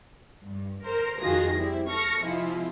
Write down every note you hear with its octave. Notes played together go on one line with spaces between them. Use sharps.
G2
A#4 C5
F2 D#3 F4 F#4 G#4 A#6
G3 C4 E4
A4 C#6 F6 A#6 C#7
C3 F3 G#3 E4 F4